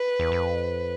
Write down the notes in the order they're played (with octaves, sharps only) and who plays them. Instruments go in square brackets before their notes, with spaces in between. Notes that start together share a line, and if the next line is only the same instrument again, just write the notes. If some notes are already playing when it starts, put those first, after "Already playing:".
Already playing: [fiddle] B4
[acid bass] E2
F2